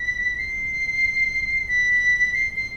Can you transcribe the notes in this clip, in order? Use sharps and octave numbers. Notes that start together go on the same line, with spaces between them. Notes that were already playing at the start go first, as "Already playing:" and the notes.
Already playing: B6
C7
B6
C7
C7